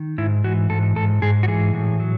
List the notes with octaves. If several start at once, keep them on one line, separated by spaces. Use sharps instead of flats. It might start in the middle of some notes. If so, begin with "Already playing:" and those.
Already playing: D#3
G#2 E4
E3 F#4
G#2 A4
G#2 A4
G#2 G#4
F#4
E3 G#4
A2
F#3